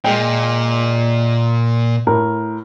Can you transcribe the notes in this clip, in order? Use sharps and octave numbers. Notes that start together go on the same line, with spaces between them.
A#2 G#3 G5
A2 A#4